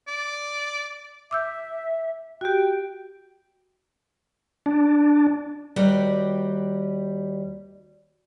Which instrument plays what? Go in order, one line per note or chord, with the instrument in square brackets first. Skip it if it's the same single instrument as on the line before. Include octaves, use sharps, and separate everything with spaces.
[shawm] D5
[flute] E5 [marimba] D6 E6 G6
[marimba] F#4 G4 [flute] G5
[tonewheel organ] D4
[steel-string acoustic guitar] D#2 G3 F#4 B4 D5 G5